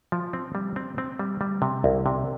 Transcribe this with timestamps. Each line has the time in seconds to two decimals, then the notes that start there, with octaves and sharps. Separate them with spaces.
0.12 F3
0.33 C4
0.55 G3
0.76 C4
0.98 C4
1.19 G3
1.41 G3
1.62 C3
1.84 C2
2.06 C3